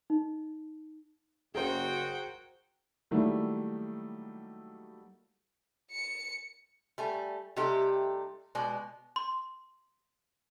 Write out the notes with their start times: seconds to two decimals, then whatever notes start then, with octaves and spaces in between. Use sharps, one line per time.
0.10 D#4
1.55 F#1 F#4 G#4 A#4 C5 G5
3.11 D#3 F#3 G3 A3 A#3 E4
5.92 C#7
6.98 G3 A3 G#5
7.56 C3 G3 A3 D#4 G4
8.55 B2 G#3 D5
9.16 C6